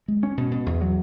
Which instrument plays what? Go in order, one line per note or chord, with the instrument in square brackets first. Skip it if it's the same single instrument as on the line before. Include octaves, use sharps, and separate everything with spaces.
[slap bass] G#3
C#4
B2
B2
E2
F#3